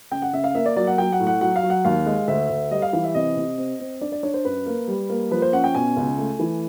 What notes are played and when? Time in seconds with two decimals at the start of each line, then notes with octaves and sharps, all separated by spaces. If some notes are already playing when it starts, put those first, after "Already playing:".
0.11 C#3 G5
0.22 F#5
0.33 C#3 E5
0.44 F5
0.55 A#3 E5
0.66 D5
0.76 F#3 D5
0.87 F#5
0.98 F#3 G5
1.12 F#5
1.20 A2
1.27 F#5
1.41 F#3 F#5
1.56 F5
1.63 F#3
1.70 F#5
1.85 D#2 F5
2.06 G#3
2.28 D2 E5
2.50 D2
2.71 G3 D#5
2.82 F5
2.93 E3 F5
3.04 E5
3.14 C3 D#5
3.36 C3
3.58 C4
3.80 C4
4.01 D4 D5
4.12 D5
4.23 D4 C#5
4.34 C5
4.45 F#2 B4
4.66 A#3
4.88 G3
5.10 A#3
5.31 F3 B4
5.42 C5
5.53 C#4 F#5
5.64 G5
5.75 B2 G#5
5.97 C#2
6.18 A3
6.39 E3